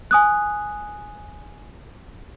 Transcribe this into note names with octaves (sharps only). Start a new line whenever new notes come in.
G#5 D#6 F#6